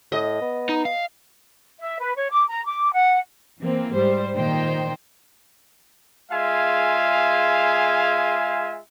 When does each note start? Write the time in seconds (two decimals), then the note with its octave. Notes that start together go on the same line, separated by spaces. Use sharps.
0.12 A2 D#5
0.41 B3
0.69 D#4
0.85 F5
1.79 E5
2.00 B4
2.17 C#5
2.30 D6
2.48 A#5
2.65 D6
2.93 F#5
3.60 E3 A#3 C4
3.94 G#2 G3 C5
4.36 A#2 D#3 D#4 C5 G5
6.31 G#3 F4 G#4 E5 F5 G#5